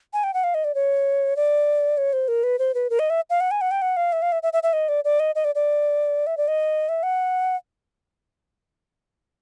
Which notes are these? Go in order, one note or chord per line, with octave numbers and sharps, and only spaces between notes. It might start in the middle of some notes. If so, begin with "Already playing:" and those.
G#5
G5
F#5
F5
D#5
D5
C#5
D5
C#5
C5
A#4
B4
C5
B4
A#4
D#5
E5
F5
F#5
G#5
F#5
G5
F#5
F5
E5
F5
E5
E5
E5
E5
D#5
D5
D5
D#5
D#5
D5
D5
E5
D5
D#5
E5
F#5